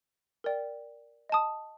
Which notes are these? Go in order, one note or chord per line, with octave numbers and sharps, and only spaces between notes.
A#4 D5 G5
D#5 A5 D#6